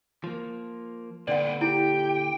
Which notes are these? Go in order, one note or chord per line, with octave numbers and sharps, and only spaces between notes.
F3 A#3
A#2 D3 C4 B4 D5 F#5
E4 G4 G5